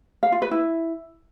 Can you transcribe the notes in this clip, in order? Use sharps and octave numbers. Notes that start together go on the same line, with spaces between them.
F5
F4
B4
E4